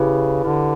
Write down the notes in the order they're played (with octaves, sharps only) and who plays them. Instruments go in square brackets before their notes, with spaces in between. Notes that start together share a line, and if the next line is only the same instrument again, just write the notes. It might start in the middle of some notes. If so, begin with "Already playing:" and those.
Already playing: [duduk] C#3 [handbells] E4 G4 B4
[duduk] D3 [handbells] E4 G4 B4